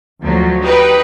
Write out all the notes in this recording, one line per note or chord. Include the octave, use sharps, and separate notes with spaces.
D2 F3 F#3
D#4 G4 B4